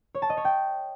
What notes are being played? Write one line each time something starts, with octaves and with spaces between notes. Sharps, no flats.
C#5
A5
D#5
C#5
G5